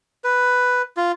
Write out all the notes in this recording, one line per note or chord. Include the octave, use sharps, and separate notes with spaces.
B4
F4